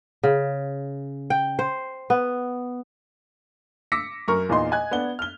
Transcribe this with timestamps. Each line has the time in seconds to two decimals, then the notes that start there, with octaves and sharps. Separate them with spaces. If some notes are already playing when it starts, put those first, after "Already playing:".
0.23 C#3
1.30 G5
1.59 C5
2.10 B3
3.92 D6 E6 A#6 B6 C#7
4.28 F#2 A#4 C#6
4.49 E2 A#2 D#4 D#5 C6
4.71 D#5 G#5 F#6 G#6
4.91 B3 D4 F#5 G7
5.19 F6 G7